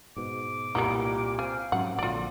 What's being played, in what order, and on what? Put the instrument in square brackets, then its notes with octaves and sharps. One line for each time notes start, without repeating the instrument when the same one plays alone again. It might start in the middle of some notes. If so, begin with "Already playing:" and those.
[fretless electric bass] G#2 B2 [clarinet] D6
[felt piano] C2 A#2 G3 [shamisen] A#3 B3 D#4
[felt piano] C4 [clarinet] F5 [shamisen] G#5
[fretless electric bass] G#2 F#3 C#4 [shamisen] F#5
[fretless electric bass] A#1 D3 [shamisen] F4 D5 [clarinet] F#4